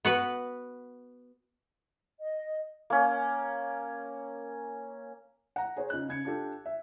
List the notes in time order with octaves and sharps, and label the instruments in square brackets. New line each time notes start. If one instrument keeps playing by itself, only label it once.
[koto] B3 F#4 B4
[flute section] D#5
[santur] A#3 C#4
[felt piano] F#5 A#5
G#4 C5 C#5
C#3 D#4 F4 F#6
C#3 G#6 C#7
D4 F4 G4 A4
E5